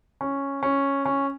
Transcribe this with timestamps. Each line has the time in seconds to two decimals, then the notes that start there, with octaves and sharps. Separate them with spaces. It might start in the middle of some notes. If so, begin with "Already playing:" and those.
0.21 C#4
0.63 C#4
1.06 C#4